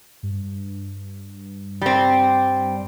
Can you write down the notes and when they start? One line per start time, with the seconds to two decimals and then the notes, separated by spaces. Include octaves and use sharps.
0.23 G2
1.82 G3 C4